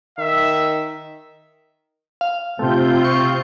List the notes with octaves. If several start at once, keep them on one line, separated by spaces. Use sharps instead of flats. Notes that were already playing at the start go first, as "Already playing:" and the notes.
D#3 E5
F5
C3 A3 C4 F4 G6
C#6